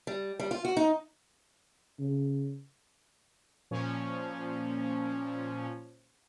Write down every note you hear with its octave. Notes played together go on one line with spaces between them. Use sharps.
G3
G3
F4
F#4
D#4
C#3
A#2 F3 C#4